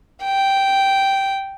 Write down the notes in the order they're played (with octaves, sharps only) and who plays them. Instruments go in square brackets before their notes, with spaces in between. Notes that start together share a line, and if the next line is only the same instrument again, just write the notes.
[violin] G5